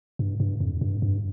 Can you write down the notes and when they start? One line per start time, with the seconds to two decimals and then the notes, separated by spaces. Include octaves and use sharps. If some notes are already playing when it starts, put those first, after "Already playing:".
0.19 G2
0.40 G2
0.60 F2
0.81 G2
1.02 G2